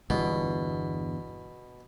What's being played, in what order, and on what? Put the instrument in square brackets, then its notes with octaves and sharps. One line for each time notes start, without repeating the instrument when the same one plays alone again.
[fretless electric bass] G1 E2 [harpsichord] B2